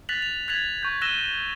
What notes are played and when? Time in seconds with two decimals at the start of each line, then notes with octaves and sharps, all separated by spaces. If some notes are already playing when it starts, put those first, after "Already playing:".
0.09 F#6 A6 B6 F7 F#7
0.22 F7
0.48 F#6 G#6 A6 B6 F7 F#7
0.83 C#6 G6
1.01 E6 F#6 A#6 D#7 E7 G7